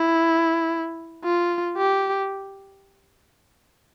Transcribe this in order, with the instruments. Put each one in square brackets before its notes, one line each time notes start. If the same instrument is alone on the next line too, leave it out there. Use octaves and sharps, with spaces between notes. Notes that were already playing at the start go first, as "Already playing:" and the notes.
Already playing: [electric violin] E4
F4
G4